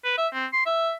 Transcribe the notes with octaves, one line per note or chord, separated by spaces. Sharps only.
B4
E5
C4
C6
E5